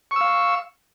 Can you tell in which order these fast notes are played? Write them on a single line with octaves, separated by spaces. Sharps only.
C#6 E6 F5